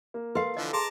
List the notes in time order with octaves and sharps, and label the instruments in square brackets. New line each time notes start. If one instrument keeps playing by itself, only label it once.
[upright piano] A#3
[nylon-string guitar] A4 F5 [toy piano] B4 C6
[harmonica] D3 E3 F3 [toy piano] D#5
[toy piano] G#4 [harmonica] A5 A#5 D6 [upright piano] C6